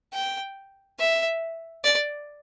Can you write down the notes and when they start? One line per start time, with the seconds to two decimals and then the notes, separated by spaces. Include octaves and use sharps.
0.13 G5
0.99 E5
1.84 D5